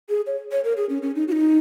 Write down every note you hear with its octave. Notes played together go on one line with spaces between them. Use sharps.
G#4
C#5
C#5
A#4
G#4
C#4
C#4
D#4
F#4
D#4